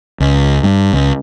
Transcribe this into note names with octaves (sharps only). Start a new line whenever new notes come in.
C#2
G2
C#2